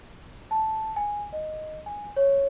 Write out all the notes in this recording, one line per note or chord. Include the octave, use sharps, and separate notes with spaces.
A5
G#5
D#5
G#5
C#5